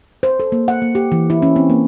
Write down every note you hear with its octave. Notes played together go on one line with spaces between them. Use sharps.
C5
A4
A#3
F#5
A#3
G4
E3
E4
C#4
C4
A#3